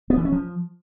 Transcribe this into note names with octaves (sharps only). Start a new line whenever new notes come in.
B3
E3
C#4
F3